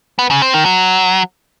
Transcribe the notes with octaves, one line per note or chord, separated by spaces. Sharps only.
B3
C#3
C4
D#3
F#3